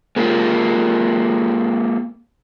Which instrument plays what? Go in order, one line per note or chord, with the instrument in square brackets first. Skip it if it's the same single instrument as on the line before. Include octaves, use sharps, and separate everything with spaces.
[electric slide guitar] G#3 A#3 F4 G4